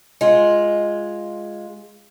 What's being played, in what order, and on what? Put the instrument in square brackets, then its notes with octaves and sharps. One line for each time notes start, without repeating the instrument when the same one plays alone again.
[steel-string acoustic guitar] G#3 F4